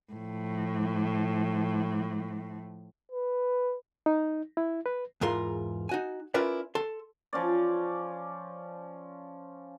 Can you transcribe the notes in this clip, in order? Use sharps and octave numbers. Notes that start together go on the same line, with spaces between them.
A2 F3
B4
D#4
E4
B4
E2 G#2 F4 A#4 C6
D#4 F#4 G#5
C#4 E4 F4 A#4 B4 D5
A4 C6
F3 C#4 D5